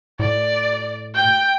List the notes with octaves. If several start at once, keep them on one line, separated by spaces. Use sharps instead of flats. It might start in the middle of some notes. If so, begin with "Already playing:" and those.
A2 D5
G5 G6